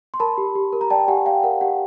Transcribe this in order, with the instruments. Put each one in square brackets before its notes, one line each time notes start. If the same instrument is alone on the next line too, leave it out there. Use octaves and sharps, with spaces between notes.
[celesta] C6
A#4 A5 B5
G4
G4
A#4
A#5
D5 G5 A5
G4 F#5 G#5
D5 F5 G5
A#4 F#5
G4 F#5